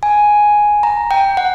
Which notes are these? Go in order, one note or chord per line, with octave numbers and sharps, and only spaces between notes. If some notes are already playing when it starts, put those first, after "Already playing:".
G#5
A#5
G5
F#5